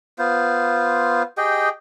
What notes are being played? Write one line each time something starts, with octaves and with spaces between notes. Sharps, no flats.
B3 F4 C5
G4 G#4 D#5 G5